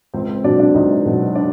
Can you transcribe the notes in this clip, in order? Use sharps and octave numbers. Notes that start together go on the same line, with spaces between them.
C#2 C4 C5
C4 C5
B2 F#3 D4 D5
D4 D5
C#2 D#4 D#5
B2 F#3
D4 D5